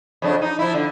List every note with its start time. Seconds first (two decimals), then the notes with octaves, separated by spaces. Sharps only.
0.22 F2 C#3 D4
0.42 D#4
0.59 F3 E4
0.74 D3